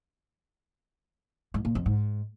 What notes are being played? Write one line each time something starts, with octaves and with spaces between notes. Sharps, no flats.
G#2
A#2
F2
G#2